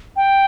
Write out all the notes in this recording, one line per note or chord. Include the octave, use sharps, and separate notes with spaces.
G5